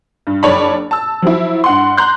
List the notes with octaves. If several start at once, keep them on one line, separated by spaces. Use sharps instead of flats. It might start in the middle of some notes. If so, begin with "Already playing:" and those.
G2
F#1 D4 C#5 D5 A5 B5
A5 E6
F3 F#3 E4
G2 F#5 C6
A#5 C6 F#6 G6